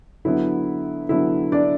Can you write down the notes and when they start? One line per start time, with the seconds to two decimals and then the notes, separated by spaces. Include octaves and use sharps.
0.25 D3 F#3 B3 E4
1.09 D3 F#3 B3 E4
1.52 D4 D5